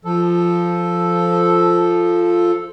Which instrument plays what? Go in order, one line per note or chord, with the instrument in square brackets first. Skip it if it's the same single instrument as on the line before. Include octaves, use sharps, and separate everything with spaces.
[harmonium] F3 A4